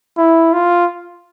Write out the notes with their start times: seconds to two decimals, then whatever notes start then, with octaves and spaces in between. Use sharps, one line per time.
0.17 E4
0.53 F4